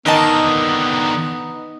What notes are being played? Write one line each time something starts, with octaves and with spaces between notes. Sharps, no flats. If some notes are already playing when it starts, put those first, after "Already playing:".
D3 D#3 B3 D#4 A#4 D#5 A5